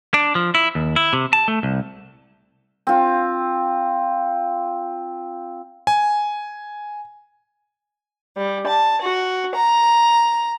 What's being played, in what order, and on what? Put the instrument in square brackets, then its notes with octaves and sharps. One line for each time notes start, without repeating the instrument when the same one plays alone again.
[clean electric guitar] D4
F3
E4
D#2
E4
C3
A5
A3
C2
[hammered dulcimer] C4 F4
[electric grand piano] G#5
[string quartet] G3
A5
F#4
A#5